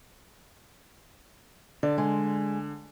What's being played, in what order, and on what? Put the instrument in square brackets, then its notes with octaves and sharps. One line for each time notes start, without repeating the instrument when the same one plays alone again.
[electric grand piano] D3 [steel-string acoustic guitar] D5
[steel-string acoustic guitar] G#3